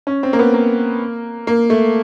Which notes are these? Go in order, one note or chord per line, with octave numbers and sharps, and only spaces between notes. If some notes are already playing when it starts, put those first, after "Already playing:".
C#4
C4
A#3
B3
A#3
A#3
A3